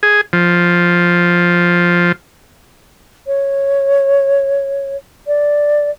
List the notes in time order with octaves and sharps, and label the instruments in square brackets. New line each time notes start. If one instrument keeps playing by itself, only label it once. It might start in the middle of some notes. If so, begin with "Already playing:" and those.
[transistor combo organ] G#4
F3
[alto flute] C#5
D5